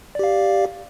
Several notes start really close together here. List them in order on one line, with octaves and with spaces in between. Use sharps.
D5 G4 F5